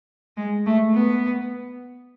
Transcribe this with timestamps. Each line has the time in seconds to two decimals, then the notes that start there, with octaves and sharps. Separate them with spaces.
0.37 G#3
0.66 A3
0.94 B3